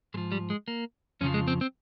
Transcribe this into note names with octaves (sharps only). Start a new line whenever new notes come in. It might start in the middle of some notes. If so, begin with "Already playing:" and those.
G#2 F3 G#3
G3
G#3
A#3
F2 C#3 F3 C#4
G#3
C4
C4